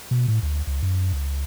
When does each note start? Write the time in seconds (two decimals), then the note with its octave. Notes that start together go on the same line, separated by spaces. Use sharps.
0.11 B2
0.28 A2
0.43 D2
0.67 C#2
0.83 F#2
1.13 C#2